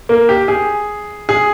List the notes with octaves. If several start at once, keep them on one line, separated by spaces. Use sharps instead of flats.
A#3
G4
G#4
G#4